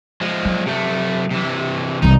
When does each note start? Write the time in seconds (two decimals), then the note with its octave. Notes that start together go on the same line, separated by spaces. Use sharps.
0.21 F3 G#3
0.45 F#3
0.66 C3 A3
1.31 C3 E3
2.02 C2 E3 D#4